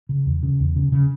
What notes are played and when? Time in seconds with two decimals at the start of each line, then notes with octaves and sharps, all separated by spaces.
0.09 C#3
0.26 E2
0.43 C#3
0.60 E2
0.76 C#3
0.92 C#3